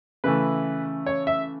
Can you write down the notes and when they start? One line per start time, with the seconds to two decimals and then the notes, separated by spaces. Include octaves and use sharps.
0.24 C#3 E3 A3 B4
1.06 C#5
1.27 E5